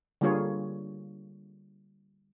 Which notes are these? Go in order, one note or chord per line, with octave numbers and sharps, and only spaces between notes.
D3 G3 A#3 F4 G#4 C#5